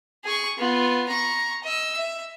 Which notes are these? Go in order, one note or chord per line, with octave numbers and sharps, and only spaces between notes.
G#4 C#6
B3 F4
A#5 C#6
D#5 E6
E5